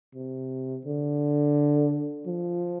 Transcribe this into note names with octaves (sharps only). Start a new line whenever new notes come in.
C3
D3
F3